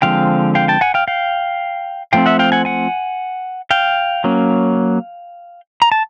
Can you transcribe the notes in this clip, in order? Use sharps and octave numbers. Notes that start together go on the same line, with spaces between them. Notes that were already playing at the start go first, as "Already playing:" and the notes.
D3 F3 G#3 C4 F5 G5
F5 G5
G5 A5
F#5 G#5
F5 G5
F5 G5
F3 A3 C4 F5 G5
E5 F#5
F5 G5
F#5 G#5
F#5 G#5
F5 G5
F#3 A#3 C#4
A#5
A5